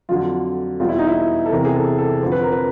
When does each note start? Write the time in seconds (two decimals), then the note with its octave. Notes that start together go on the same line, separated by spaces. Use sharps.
0.09 F2 D3 F#3 F4
0.80 E2 B2 G3 F4
0.89 E4
0.99 D#4
1.08 E4
1.46 A4
1.51 E2 C3 E3 A#4
1.65 G#4
1.75 A4
1.98 A4
2.22 F2 D3 F3 C5
2.32 B4
2.42 A#4
2.52 B4